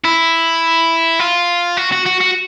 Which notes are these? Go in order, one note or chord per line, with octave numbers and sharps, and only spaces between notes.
E4
F4
F#4
F#4
F#4
F#4